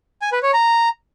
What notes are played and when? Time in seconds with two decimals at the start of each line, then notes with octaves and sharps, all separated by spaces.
0.22 G#5
0.32 B4
0.43 C#5
0.53 A#5